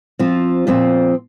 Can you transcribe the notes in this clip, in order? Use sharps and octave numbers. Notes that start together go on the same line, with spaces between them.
F3 C4 F4
A#2 F3 C4